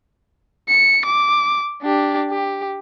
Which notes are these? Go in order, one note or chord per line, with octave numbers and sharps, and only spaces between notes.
C#7
D6
D4 G4
G4